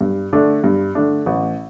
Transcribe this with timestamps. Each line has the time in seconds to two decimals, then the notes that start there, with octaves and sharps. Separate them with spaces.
0.01 G2
0.33 D3 A3 D4
0.64 G2
0.95 D3 A3 D4
1.26 A1